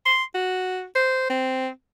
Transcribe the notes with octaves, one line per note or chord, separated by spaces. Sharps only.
C6
F#4
C5
C4